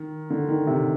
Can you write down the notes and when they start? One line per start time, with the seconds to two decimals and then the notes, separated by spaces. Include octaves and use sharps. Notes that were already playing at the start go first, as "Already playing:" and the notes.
Already playing: D#3
0.30 D3
0.49 D#3
0.67 C3